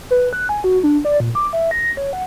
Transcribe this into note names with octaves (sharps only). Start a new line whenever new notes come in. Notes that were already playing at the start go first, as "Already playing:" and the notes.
B4
F#6
G#5
F#4
D4
D5
A#2
D6
E5
A#6
C#5
F#5